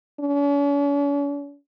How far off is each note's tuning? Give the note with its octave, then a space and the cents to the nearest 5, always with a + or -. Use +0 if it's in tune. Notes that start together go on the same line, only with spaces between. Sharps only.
C#4 +45